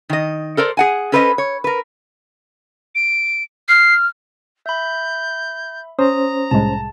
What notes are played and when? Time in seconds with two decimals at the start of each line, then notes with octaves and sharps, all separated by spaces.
0.10 D#3 D#5
0.57 A4 A#4 C5 D5
0.77 G#4 F#5 G#5
1.12 C#4 A4 B4 C5 D5 D#5
1.38 C#5
1.64 A#4 B4
2.95 D7
3.69 F6 C7
4.66 E5 B5 G6
5.99 C#4 C5 A#5 D#6
6.51 C2 A2 G#3 A5